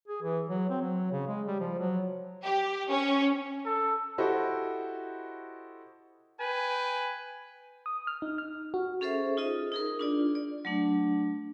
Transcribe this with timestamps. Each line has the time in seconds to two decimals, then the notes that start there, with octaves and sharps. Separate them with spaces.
0.08 G#4
0.23 E3
0.49 F#3
0.70 C4
0.82 F#3
1.12 C#3
1.28 G#3
1.47 G3
1.60 F3
1.79 F#3
2.43 G4
2.89 C#4
3.66 A4
4.18 E4 F#4 G4 A4 C5 D#5
6.40 B4 G5 G#5
7.86 D#6
8.07 F6
8.22 D#4
8.38 F6
8.74 F#4
9.01 C#4 G#4 A4 C5 E5
9.37 D#4 F4 G#4 D#5
9.72 D#4 G#4 A#4
9.99 D4 F4 D5
10.35 D5
10.65 F#3 A3 D4